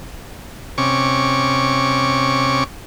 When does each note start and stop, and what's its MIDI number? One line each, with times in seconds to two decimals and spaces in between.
0.78 2.64 48
0.78 2.64 61
0.78 2.64 85
0.78 2.64 86